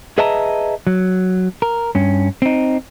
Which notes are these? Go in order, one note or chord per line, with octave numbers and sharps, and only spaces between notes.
G#4 B4 D#5 E5 A5 A#5
F#3
A#4
G2 C#4
C4 D#4